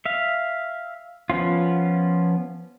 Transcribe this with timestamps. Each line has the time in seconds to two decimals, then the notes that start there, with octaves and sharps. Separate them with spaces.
0.06 E5 F5
1.30 F3 B3 C#4 F4